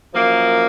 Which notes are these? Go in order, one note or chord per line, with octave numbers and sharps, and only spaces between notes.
F#2 F3 A#3